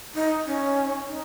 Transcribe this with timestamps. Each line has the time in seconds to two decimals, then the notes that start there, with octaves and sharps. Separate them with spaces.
0.14 D#4
0.46 C#4
1.06 D#4